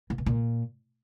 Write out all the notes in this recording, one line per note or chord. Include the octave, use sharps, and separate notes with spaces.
A#2
B2
A#2